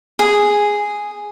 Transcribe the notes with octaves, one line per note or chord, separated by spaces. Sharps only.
G#4